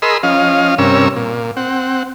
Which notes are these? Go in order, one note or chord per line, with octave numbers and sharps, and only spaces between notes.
G#4 A#4 D#5 B5 C6 E6
F3 C#4 D#5 F5
G2 C3 C#4 A#4 C#5 E6
A#2
C4 F#5